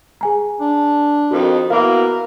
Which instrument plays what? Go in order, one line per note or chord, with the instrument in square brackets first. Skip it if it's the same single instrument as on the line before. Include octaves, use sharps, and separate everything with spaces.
[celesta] G#4 G#5 A#5
[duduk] D4
[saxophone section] F2 D#3 [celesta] F#4
[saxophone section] B2 A#3 E4 [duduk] A#4 [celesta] F5